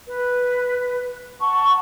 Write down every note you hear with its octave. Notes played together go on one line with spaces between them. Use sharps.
B4
F#5 A5 C#6